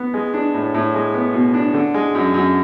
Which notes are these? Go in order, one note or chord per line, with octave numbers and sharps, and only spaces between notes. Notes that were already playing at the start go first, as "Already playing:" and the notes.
Already playing: B3
G#3
D4
A2
A2
G#3
B3
B2
D4
D3
G#3
F#2
F#2